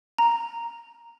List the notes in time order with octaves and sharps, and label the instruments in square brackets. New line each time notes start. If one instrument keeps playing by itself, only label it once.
[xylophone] A#5